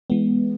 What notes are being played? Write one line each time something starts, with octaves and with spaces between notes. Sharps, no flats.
E3 G#3 B3